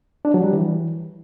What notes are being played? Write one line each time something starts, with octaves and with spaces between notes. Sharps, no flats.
D4
F#3
G3
E3